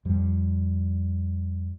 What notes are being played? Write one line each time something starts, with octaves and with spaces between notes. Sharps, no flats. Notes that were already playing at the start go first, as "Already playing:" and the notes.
F2 F3 G3